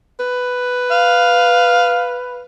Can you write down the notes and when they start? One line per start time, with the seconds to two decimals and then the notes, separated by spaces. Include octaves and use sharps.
0.19 B4
0.92 F5